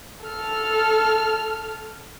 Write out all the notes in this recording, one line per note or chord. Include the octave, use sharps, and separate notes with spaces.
A4 F6